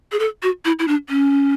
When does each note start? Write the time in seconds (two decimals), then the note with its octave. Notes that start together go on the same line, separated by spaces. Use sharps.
0.12 G#4
0.19 A4
0.43 F#4
0.65 E4
0.79 E4
0.88 D4
1.09 C#4